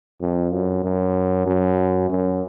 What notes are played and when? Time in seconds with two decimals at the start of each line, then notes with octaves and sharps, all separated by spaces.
0.21 F2
0.53 F#2
0.84 F#2
1.47 F#2
2.09 F#2